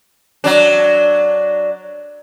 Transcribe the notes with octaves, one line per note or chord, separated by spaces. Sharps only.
F#3 D4